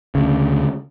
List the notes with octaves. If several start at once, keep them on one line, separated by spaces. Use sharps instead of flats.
D2 C#3